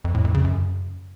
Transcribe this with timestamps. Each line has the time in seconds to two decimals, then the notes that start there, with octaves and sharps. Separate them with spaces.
0.04 F2
0.14 A2
0.24 F2
0.34 C#3
0.44 F#2